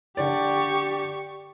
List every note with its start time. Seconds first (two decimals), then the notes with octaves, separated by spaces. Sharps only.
0.17 D3 G4 D5 C#6